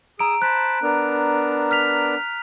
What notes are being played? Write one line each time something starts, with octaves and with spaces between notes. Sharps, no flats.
G#4 A#5 D#6 E6 D7
C5 A5 B5 F#6
B3 D4 A#4
F6 B6 F7